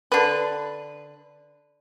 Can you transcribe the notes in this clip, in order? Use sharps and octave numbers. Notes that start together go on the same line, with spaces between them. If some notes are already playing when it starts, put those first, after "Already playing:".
D3 B4